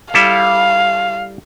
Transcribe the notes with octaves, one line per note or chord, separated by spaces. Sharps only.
G3 E4 A4 F5